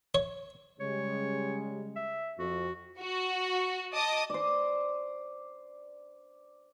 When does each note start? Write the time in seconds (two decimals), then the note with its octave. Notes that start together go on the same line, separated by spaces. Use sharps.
0.15 C#5
0.80 C#3 G3 G#3 C#5
1.96 E5
2.39 F2 F#4
2.99 F#4
3.94 D#5 A5 D6 D#6
4.30 C5 D5